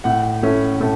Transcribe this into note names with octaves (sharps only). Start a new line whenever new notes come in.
A2 F#5
A3 C#4 E4
A2 A4